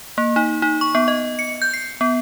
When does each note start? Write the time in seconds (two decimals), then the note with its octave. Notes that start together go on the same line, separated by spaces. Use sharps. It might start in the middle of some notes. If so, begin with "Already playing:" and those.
0.18 A#3
0.36 D#4
0.62 D#4
0.81 C#6
0.95 B3
1.08 D#5
1.39 C#7
1.62 G6
1.74 C7
2.01 B3